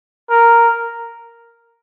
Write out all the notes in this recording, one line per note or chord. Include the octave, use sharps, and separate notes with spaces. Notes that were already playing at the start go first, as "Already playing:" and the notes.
A#4